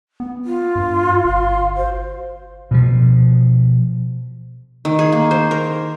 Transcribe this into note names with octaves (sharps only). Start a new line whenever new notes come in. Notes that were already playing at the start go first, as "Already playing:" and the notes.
B3
F4
G2 C6
G1 F5 C6
F#4 C5
B2 F3
D#3
G#4
A#3
C5
A#4